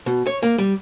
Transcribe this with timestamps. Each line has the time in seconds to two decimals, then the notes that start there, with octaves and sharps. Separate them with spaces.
0.06 B2
0.27 C#5
0.43 A#3
0.58 G3